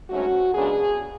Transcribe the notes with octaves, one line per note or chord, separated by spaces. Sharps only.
G#2 F#3 A3 C#4 F#4
F#2 C#3 G#3 B3 D4 G#4